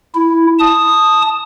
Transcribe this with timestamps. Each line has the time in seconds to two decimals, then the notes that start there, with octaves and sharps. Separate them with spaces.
0.15 E4
0.59 A5 D#6